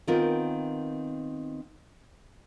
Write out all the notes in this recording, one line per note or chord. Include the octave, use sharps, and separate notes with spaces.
D#3 B3 C4 F4 A#4